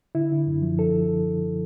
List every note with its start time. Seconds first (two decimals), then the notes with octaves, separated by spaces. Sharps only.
0.15 D3 E4
0.32 D3
0.47 F#2
0.62 F3
0.79 A4